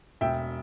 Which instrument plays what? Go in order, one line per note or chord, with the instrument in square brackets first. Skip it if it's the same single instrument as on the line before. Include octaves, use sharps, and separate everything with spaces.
[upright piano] E1 E5 G5